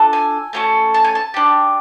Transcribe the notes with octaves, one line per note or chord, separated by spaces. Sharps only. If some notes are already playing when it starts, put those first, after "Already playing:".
Already playing: D4 F4 A4
G#5
A3 C#4 F#4 A4
A5
G#5
A5
D4 G4